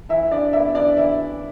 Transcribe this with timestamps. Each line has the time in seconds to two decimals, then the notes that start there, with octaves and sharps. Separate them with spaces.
0.09 E3 E4 E5
0.31 D4 D5
0.53 B3 E4 E5
0.75 D4 D5
0.97 E3 E4 E5